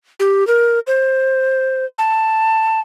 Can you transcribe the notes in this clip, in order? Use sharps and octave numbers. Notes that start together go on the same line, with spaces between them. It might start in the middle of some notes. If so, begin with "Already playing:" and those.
G4
A#4
C5
A5